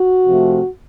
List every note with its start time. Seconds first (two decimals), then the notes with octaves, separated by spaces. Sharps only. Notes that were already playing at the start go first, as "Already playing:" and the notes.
Already playing: F#4
0.27 C3 F3 A3